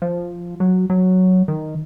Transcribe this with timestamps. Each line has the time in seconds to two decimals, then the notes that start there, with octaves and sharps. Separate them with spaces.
0.02 F3
0.60 F#3
0.90 F#3
1.48 D#3